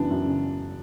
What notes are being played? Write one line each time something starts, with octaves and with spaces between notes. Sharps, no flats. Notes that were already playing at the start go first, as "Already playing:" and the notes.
Already playing: F#2 C#3 E3 B3 D4
F#2
C#3